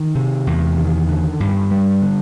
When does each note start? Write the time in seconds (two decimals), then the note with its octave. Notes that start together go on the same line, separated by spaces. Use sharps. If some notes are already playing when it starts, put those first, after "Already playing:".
Already playing: D#3
0.15 C3
0.47 E2
0.78 D#3
1.09 D3
1.40 G2
1.71 G3
2.02 D3